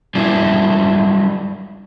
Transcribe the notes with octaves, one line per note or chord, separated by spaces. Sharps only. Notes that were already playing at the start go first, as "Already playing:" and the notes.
G3 G#3 D4 E4 F4